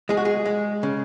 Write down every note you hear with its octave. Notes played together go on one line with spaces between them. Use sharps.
G#3 G#4
F#4
G#4
G#3
C#3